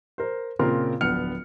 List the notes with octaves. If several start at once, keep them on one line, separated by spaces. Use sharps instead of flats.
A#4 C5
A#2 C#3 C4 A#4 C6
D1 A#1 B3 F#5 F6 C#7